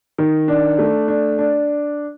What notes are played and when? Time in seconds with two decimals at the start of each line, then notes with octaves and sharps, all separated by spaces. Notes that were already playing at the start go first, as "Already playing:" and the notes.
0.18 D#3
0.48 D4
0.79 A3
1.08 D4
1.39 D4